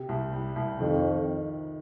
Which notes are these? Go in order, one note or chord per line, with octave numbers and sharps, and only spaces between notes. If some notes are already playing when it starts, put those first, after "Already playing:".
Already playing: C3 G4
C2
G3
C2
F2 D#3